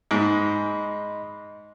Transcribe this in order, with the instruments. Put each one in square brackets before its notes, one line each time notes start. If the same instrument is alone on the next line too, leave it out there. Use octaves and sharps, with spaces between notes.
[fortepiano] G#2 [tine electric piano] D#5 B5 C6